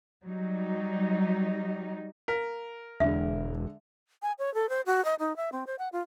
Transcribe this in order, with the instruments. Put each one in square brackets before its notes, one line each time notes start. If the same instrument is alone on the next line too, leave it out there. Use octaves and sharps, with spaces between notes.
[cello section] F#3 G3 D#4
[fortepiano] A#4 [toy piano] F5
[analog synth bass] E1 [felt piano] D3 G#3 [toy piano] E5
[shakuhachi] G#5
C#5
A4
C5
F#4
D#5
D#4
E5
C4
C5
F#5
F4